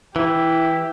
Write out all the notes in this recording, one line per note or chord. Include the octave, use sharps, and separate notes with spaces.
E3 E4 G4